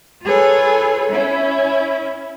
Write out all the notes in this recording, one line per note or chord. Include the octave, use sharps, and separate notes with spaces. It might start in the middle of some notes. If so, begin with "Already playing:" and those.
F4 G#4 A4 B4 C#5
C#4 E4